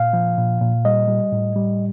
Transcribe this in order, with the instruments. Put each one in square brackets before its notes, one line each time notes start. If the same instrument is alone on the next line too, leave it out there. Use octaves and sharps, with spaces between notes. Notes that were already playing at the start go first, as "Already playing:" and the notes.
Already playing: [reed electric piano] A#2 F5
F3
A#2
A#2
G3 D#5
G3
A2
G3